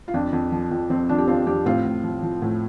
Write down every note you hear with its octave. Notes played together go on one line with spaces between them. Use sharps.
F4
F2 D4
F2
F3
F2
F2 C4
F3 D4
G4
F2 C4 F4
F2 D4 G4
A2 C4 F4
A2
F3
F3
A2